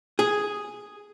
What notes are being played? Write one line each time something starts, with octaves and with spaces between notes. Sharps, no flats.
G#4